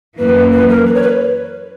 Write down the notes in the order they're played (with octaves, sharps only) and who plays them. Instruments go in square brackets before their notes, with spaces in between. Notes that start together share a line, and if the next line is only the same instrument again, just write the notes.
[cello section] F#2 E3 A#3 [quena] B4
[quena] B4
A#4
B4
C#5
B4